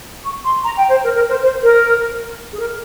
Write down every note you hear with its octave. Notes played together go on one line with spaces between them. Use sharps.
C#6
C6
A#5
G5
C5
A#4
A#4
C5
C5
A#4
G#4
A#4